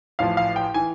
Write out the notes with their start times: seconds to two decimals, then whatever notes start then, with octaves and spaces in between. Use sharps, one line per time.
0.19 A1 A2 F3 F5
0.37 F5
0.56 G5
0.74 E3 G#5